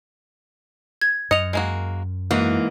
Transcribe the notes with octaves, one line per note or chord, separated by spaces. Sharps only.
G#6
F#2 D#5 C#7 F7
G#3 A#3 F#4
G#2 E3 A#3 F#4